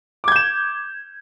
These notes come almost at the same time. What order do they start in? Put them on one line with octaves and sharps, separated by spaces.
D6 G#6 G6 E7